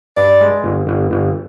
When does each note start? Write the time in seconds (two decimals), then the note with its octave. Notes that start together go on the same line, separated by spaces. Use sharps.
0.17 G2 D5
0.41 G#3
0.64 G1
0.87 G1
1.11 G1